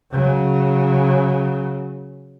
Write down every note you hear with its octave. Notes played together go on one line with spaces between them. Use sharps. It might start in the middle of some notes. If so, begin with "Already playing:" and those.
C#3 F#3